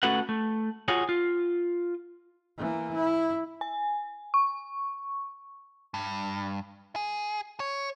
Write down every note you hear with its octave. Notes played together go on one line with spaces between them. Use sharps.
A3 C#4 F#4 A4 B4 F#5
A3
F4 F#4 G#4 C#5
F4
E3 A#3
E4
G#5
C#6
G2
G#4
C#5